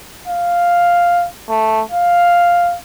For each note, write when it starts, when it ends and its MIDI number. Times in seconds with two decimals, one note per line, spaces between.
0.28 1.27 77
1.50 1.82 57
1.92 2.76 77